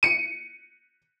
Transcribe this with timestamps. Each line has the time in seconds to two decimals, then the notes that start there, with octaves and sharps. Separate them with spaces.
0.03 C#7 D#7